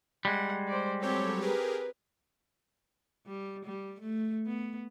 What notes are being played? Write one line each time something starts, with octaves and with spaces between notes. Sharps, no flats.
G3 G#3 F#5
C5 D5
F#3 C4 G4 A4 C#5
G4 G#4 A#4 B4
G3
G3
A3
B3